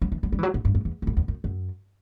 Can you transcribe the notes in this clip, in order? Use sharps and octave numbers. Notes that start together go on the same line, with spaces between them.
F#3
E3
F#3
G3
E3
F#3
A2
G2
F#2
E2
E2
F#2
E2
F#2
F#2